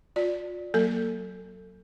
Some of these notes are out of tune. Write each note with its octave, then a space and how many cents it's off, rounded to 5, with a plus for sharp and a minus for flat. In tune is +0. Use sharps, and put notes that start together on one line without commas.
F4 +30 D5 +0
F#3 +0 A#3 +0 A4 +20